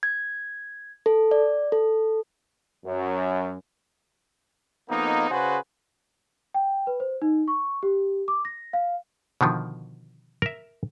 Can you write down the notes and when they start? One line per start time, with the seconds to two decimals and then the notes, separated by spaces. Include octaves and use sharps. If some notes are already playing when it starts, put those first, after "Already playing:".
0.03 G#6
1.06 A4
1.31 D5
1.72 A4
2.85 F#2
4.90 F2 A#3 B3 D#4
5.30 C#3 F#4 G#4 B4 C5
6.54 G5
6.87 B4
7.00 C5
7.22 D#4
7.48 C#6
7.83 G4
8.28 D6
8.45 A#6
8.73 F5
9.41 B2 D3 D#3 F3
10.42 A#4 E5